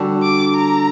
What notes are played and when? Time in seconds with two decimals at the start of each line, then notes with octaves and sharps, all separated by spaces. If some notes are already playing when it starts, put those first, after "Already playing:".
Already playing: D3 G3 D4 F#4
0.23 D6
0.55 A#5